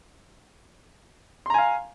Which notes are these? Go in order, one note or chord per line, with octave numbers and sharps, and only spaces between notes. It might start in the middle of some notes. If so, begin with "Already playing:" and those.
F5 G#5 A#5 C6